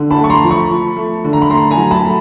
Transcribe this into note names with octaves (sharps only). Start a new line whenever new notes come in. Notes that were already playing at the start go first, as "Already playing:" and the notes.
Already playing: D3
A5 B5
A3
C#6
A#5 C6
F3
B5 C#6
F3
A3
D3
A#5
B5
A3 A#5 C6
G#5 A#5
F#3
A5 B5
A3